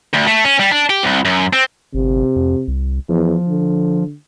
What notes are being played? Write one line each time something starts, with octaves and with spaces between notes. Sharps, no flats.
D2
A3
C#4
G3
D4
G4
C2
F#2
C4
G1 C3
F2
C2
E2 F3
D3